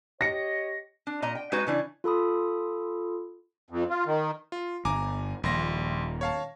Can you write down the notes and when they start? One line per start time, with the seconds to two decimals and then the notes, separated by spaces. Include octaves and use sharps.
0.21 G4 C#5 D#5 A#6 C#7
1.07 D4
1.22 A#2 D#5 A#5
1.35 G5
1.52 G#3 D#4 F#4 B4
1.67 C#3 E3 D4
2.04 F4 A4 B5 D#6
3.70 F2
3.90 F4
4.06 D#3
4.52 F4
4.85 G1 G#5 A#5 D6
5.44 D#1 A#1 C6 A#6
6.21 C#5 F5 A5